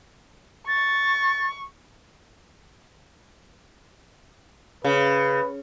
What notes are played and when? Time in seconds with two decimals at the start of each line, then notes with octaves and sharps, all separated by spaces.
0.68 C#6 A6
4.84 C#3 B4